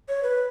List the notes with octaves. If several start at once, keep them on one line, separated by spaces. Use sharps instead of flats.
C#5
B4